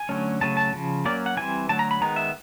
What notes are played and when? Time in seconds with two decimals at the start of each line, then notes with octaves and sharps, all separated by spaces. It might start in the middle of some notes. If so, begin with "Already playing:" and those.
Already playing: G#5
0.09 D3 F#3 A3 C#4
0.41 C#3 F#3 A3 C#4 A5
0.57 A5
0.73 C#3 F3
1.05 F#3 A#3 C#4 D5
1.26 F#5
1.37 E3 G3 C4 G#5
1.69 D3 F#3 A3 A5
1.79 A#5
1.91 B5
2.01 D#3 G#3 B3 A#5
2.16 E5